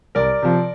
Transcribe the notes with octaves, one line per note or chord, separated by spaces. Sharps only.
C2 A#4 D5
C3 F3